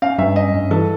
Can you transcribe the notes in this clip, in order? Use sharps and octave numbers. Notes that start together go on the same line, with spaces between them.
C#4 F5
G2 E5
C#4 D#5
G2
E3 A4